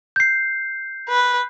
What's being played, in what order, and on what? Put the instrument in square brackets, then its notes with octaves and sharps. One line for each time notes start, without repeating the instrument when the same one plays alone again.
[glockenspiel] G6 C7
[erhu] B4